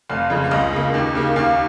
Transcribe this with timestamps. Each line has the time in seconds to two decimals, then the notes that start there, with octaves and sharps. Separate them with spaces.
0.09 F1 F5
0.30 F2 C#3 G#3
0.44 F5
0.51 C#2 D#5
0.73 C#3 A#3
0.94 D#2
1.15 C#3 A#3
1.36 D#2 F5